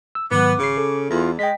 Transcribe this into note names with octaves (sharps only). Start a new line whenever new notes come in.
E6
G#2 D#3 F#3 B3 D6
G#1 C#3 C7
A4
E2 F4
G#3 D#5 G5 B6